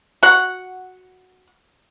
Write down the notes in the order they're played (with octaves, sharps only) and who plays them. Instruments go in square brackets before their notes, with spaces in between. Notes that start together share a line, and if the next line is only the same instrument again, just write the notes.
[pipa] F#4 F#5